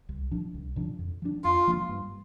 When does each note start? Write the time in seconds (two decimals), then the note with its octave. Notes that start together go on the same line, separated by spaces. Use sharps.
0.09 C2
0.31 A#2 F3 D4
0.54 C2
0.76 A#2 F3 D4
0.99 F2
1.22 F3 A#3 D4
1.44 F2 F4
1.67 F3 A#3 D4
1.89 G2